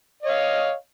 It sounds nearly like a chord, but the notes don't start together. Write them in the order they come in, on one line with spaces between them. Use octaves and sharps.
D#5 C#5 F5